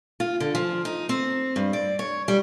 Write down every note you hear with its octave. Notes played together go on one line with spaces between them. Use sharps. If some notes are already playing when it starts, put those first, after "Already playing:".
F4
D3
F3
D#4
C4
G2
D5
C#5
G3